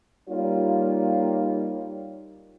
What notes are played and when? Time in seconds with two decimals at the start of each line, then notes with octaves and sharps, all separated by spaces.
0.29 G3 A#3 D#4 F4 C#5